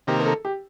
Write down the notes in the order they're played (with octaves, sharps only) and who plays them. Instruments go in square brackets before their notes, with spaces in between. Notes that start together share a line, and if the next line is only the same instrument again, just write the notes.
[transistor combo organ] C3 D#3 A#3 [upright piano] G4
[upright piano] A#4
A4
G4